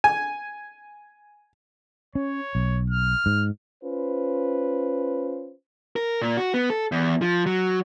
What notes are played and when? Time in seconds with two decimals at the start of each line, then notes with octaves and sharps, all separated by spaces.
0.04 G#5
2.15 C#4 C#5
2.55 B1
2.90 F6
3.26 G#2
3.83 C#4 F4 B4 C5
5.96 A#4
6.22 A#2
6.37 F#4
6.54 B3
6.70 A4
6.92 E2
7.22 F3
7.46 F#3